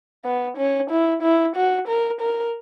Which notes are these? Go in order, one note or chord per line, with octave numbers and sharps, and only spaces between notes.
B3
C#4
E4
E4
F#4
A#4
A#4